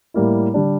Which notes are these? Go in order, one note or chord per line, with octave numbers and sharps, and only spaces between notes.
A2 G3 A#3 E4
D3 G3 D4